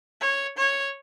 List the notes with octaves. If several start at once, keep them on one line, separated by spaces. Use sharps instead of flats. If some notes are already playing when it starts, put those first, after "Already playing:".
C#5
C#5